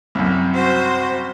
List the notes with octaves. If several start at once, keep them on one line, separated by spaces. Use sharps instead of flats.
C2 F#2
F#4 C5